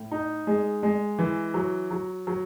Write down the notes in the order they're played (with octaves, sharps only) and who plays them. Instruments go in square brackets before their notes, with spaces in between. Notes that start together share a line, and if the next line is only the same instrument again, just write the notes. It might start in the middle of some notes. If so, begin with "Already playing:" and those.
Already playing: [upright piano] A2
D#4
G#3
G#3
E3
F#3
F#3
F#3